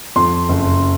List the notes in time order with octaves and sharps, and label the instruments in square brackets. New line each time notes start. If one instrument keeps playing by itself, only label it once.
[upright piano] F2 C6
F#1